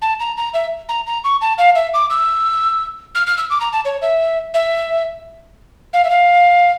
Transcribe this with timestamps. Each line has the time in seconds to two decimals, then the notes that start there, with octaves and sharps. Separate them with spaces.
0.02 A5
0.20 A#5
0.37 A#5
0.54 E5
0.89 A#5
1.07 A#5
1.24 C#6
1.41 A5
1.58 F5
1.75 E5
1.94 D6
2.10 E6
3.15 F6
3.27 F6
3.38 E6
3.50 D6
3.61 A#5
3.73 A5
3.85 C#5
4.02 E5
4.54 E5
5.93 F5
6.05 E5
6.10 F5